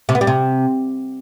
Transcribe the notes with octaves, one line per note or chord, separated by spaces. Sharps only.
C3
B3
G3
C3